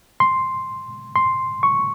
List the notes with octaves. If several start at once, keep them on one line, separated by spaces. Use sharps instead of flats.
C6
C6
C#6